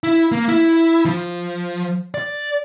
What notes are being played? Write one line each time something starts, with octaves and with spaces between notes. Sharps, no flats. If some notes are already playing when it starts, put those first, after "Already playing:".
E4
A#3
E4
F3
D5